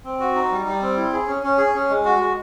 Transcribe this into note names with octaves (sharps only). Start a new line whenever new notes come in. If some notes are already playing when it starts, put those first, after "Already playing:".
C4
F#4
D#4
G3
G3
C4
E4
G#4
C#4
C#4
G#4
C#4
G#3
F#4
G#3